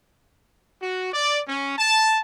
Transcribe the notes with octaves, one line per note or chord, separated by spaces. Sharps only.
F#4
D5
C#4
A5